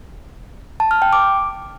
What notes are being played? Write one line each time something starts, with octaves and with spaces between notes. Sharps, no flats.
A5
F6
G5
D6